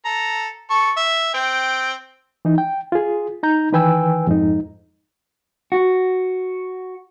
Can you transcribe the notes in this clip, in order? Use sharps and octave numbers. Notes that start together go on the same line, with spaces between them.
A4 A#5
A4 C#6
E5
C4 G5
E3 D#4
G5
F4 G#4
D#4 A#5 G6
D#3 E3 B4 G5 G#5 E6
F2 G#2 D#4
F#4